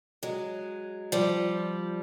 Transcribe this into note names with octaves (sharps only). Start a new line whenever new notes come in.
F#3 G#3
F3 G3